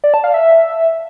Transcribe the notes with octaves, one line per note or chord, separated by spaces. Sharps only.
D5
A5
F5
E5